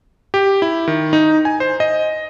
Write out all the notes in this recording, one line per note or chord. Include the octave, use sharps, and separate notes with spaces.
G4
E4
D#3
D#4
G#5
C5
D#5